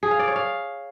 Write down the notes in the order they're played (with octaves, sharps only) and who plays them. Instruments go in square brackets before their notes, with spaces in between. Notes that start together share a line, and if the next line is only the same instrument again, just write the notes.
[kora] G#4
F5
D5
C#5
F5